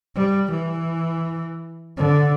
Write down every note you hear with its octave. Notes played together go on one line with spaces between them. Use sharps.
G3
E3
D3